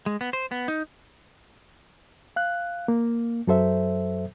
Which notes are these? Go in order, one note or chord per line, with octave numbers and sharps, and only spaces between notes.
G#3
B3
C5
B3
D#4
F5 F#6
A#3
F#2 F#3 A4 C5 E5